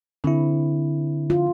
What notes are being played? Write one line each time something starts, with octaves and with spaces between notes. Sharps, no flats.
D3 C4 E4
F4